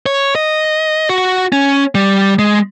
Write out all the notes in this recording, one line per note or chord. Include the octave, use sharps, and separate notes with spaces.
C#5
D#5
F#4
C#4
G3
G#3